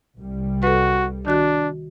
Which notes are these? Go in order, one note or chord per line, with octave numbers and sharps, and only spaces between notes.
C2 G3
F#4 A4 B4
D#3 D4 F#4 F#6